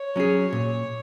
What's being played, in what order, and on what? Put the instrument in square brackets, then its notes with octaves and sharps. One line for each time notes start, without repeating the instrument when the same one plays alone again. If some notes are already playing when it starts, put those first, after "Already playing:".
Already playing: [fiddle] C#5
[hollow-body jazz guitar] F#3 C#4 G#4
A#2